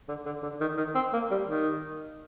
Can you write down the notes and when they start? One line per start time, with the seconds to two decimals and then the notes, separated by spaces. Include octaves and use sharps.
0.08 D3
0.26 D3
0.43 D3
0.61 D#3
0.77 D#3
0.95 C4
1.13 A#3
1.31 G3
1.48 D#3